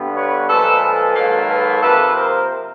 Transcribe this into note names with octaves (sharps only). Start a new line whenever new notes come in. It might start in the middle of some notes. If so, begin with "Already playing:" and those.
Already playing: G2 D3 G3 B3
B4 C#5
A#2 F3 G#3 A4 B4
A4 B4
G#2 D#3 F#3 A#3
A4 B4
C3 F3 A#3 A4 B4
A#4 C5